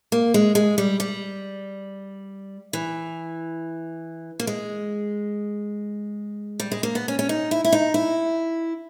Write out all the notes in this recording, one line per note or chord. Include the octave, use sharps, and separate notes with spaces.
A#3
G#3
G#3
G3
G3
E3
A#3
G#3
G3
G#3
A#3
B3
C#4
C#4
D#4
E4
E4
D#4
E4